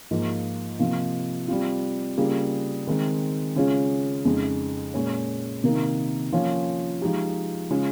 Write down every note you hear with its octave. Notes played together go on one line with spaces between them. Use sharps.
G#2 F3 A#3 F4
C3 F3 A#3
G3 C4 F4
C#3 G3 A#3 F4 G#4
D#3 G#3 C4
C#3 G#3 C#4 F4 G#4
F2 C#3 G#3 D#4
A#2 G#3 C#4
C3 D#3 A#3 D#4 A#4
F3 A#3 C#4
F3 G#3 D#4 G4
C#3 G#3 C#4 F4 G#4